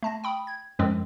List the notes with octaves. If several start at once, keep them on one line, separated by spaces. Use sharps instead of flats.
A3 A5 A#6
G5 B5 D#6
G#6
F#2 F3 G#3 C4